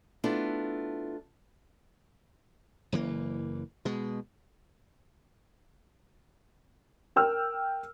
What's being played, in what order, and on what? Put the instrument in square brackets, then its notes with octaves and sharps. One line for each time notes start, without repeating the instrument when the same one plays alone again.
[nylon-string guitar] A3 B3 D4 E4 F4 A4
[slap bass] F#1 E3 A#3
B2 G#3
[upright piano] A#4 G5 E6 F6